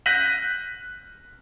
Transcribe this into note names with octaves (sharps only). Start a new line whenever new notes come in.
F#6 G6 A#6 B6 D#7 F#7